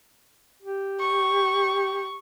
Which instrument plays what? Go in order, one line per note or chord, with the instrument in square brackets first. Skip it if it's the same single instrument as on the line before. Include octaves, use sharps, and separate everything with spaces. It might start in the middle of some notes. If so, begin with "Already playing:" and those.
[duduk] G4
[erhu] C#6